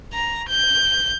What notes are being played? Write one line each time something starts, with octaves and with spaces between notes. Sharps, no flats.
A#5
G6